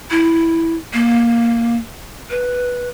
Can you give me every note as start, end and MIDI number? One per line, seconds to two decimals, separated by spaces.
0.11 0.76 64
0.93 1.77 58
2.30 2.89 71